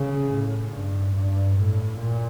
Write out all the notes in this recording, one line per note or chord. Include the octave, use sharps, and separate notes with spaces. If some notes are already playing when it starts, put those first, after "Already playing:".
Already playing: C#3
A2
G2
G2
A2
A#2